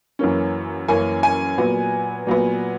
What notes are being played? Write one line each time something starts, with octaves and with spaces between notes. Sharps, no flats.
F#2 E3 A#3 C#4
F#2 E3 A#3 C#4 G#5
G#5
A#2 F#3 B3
A#2 F#3 B3